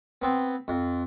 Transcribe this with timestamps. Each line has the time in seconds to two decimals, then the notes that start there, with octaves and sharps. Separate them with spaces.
0.22 B3 C4
0.68 F2